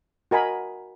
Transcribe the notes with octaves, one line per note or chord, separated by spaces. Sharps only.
F#4 A#4 D#5 G#5 B5